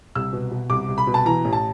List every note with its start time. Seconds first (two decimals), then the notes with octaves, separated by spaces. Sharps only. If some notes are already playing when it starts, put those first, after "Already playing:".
0.15 C2 E6
0.33 B2
0.51 B2
0.70 C2 D6
0.88 C2
0.98 B5
1.07 B2
1.14 A5
1.25 E3 A#5
1.45 A1
1.53 A5